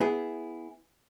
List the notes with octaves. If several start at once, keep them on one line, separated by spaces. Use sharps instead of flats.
B3 E4 G#4